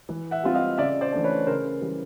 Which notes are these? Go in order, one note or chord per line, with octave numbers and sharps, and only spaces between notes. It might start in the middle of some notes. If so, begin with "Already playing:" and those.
E3
E5 F#5
G3 C4 F4
D#5 F5
C#3 D5 E5
C5 D5
E3 A3 D4
B4 C#5
C#3 A#4 C5
E3 G3